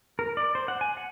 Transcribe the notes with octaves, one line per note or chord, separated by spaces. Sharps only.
A#4
D5
C5
F#5
G#5
F#5